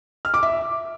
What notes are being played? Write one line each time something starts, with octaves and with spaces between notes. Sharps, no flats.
F6
D6
E5